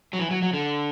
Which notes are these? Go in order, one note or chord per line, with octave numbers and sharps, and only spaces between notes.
F#3
E3
F#3
F#3
D3